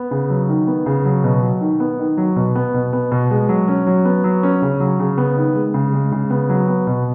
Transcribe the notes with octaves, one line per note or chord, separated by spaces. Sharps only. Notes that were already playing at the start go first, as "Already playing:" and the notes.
Already playing: B3
C#3
F#3
D#3
B3
C#3
F#3
B2
F#3
D#3
B3
D#3
F#3
B2
B3
B2
B3
B2
G#3
F#3
C#4
F#3
B3
F#3
C#4
C#3
F#3
C#3
B3
D#3
G#3
C#3
G#3
C#3
B3
F#3
B3
B2